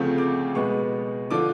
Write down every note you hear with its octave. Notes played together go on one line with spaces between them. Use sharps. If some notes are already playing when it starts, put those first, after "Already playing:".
Already playing: D2 C#3 F3 A3 C4
D6
B2 G#3 B3 C#6
D3 F3 D6